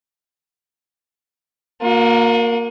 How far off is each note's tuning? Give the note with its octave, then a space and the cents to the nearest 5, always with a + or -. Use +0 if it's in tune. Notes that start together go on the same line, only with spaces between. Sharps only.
A#3 +0 F#4 -45